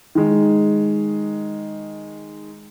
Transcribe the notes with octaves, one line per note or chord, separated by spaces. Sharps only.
D#3 G#3